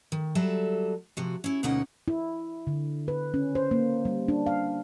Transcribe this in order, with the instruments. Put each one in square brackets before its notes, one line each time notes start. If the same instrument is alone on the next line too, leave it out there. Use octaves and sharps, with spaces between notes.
[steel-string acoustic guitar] D#3
F#3 G3 A4 E5
C3 F3 F#4
C#4 E4
D2 B2 A#3 C#4 D#4 F#5
[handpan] E4
D3
B4
C#4
C5
A#3
G3
D4
F5